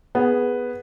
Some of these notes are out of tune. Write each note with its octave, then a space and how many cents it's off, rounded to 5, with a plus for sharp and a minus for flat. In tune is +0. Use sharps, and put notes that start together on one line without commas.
B3 +0 G#4 +0